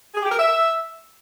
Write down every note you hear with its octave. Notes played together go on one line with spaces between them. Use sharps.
G#4
G4
A#4
E5